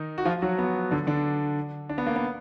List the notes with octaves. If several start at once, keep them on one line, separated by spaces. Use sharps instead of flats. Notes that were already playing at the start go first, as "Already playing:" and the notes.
Already playing: D#3 D#4
F#4
F3 F4
F#3 F#4
B3
D3 D4
D3 D4
D4
B3
A#3
B3